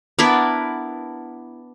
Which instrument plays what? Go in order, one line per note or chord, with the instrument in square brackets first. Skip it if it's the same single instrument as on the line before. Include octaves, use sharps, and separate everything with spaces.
[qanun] B3 D4 E4 A#4